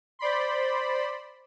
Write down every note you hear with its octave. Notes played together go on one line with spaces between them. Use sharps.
C5 D5 B5 C6